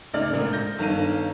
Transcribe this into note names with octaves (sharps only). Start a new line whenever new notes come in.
D2 C#3 D#4 D5 F6
G#1 A#2 D3
G6 A#6
G1 D#3 D4 F5 D#7